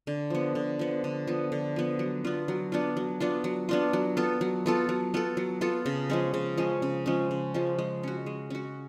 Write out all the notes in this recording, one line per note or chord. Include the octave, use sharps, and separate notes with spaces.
D3
F3 B3
D3
F3 B3
D3
F3 B3
D3
F3 B3
F#3
B3 D4 F4
F#3
B3 D4 F4
F#3
B3 D4 F4
F#3
B3 D4 F4
F#3
B3 F4 A4
F#3
B3 F4 A4
F#3
B3 F4 A4
F#3
B3 F4 A4
C#3
F3 G#3 C#4
C#3
F3 G#3 C#4
C#3
F3 G#3 C#4
C#3
F3 G#3 C#4
G#3
C#4 F#4
G#3
C#4 F#4